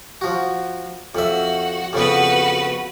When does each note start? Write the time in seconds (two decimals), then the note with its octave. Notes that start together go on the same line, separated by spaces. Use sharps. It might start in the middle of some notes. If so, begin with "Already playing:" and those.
0.21 F3 F#4
1.15 F2 F#4 E5
1.93 F2 C#3 B3 F#4 B4